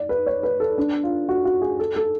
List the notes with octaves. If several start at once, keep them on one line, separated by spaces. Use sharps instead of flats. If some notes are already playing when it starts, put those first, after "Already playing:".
Already playing: D5
B4
C#5
B4
A4
D4
F4
F#4
F#4
G#4
A4
A4